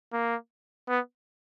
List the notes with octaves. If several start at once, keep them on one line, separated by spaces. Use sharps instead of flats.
A#3
B3